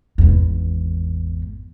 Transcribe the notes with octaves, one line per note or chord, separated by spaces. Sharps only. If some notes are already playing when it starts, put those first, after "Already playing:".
G#1 E2